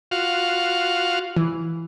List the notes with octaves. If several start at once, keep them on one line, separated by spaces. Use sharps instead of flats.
F4 F#4 F5
E3